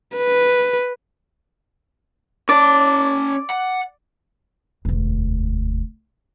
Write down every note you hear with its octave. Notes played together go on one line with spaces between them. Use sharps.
B4
C#4 D5 A5
F#5
E1 D2